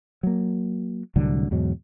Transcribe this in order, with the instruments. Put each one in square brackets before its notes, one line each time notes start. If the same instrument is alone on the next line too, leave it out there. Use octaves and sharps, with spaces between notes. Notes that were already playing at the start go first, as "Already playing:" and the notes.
[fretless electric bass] F#3 A#3
C2 A2 D3 F#3
E2 G#2 B2 F#3